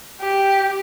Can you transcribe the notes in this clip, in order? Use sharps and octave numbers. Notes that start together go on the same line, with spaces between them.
G4